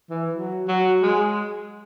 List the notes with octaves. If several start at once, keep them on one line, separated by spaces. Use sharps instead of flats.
E3
F#3
F#3
G#3